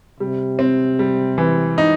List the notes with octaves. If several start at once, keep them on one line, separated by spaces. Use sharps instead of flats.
C3 G3
C4
G3
E3
D#4